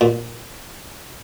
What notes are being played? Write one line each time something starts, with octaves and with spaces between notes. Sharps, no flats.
A#2